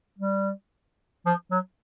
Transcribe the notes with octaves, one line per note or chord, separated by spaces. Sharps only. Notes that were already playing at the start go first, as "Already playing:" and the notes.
G3
F3
F#3